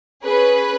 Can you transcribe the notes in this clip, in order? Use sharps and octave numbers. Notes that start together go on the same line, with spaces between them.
C#4 G#4 B4